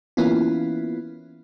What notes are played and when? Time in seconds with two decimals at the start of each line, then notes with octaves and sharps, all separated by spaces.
0.17 E3 A#3 B3 C#4 E4 F4